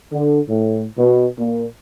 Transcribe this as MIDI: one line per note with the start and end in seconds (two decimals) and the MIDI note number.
0.12 0.41 50
0.49 0.85 45
0.98 1.28 47
1.39 1.66 46